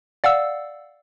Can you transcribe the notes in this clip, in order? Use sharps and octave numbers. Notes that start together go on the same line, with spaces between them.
D5 F5 F#5 E6